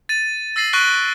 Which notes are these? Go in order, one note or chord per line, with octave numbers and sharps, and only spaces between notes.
A6 D#7
E6 A6 A#6 C7 D#7 F#7
C#6 F#6 A#6 B6 D7 G7